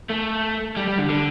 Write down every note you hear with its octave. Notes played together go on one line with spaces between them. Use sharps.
A3
G3
G3
D3
D3